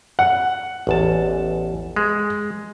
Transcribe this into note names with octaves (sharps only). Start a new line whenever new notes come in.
F#5
A1 E2 A5
G#3